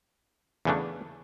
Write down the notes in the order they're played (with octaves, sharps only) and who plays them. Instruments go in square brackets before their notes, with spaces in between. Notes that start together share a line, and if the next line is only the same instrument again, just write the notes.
[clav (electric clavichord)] E2 C#3 E3 A3 D4